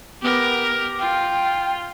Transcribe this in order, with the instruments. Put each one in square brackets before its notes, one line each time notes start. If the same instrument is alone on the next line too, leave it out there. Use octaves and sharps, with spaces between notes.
[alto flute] B3 [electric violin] G4 A#4
[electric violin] F4 [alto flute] G5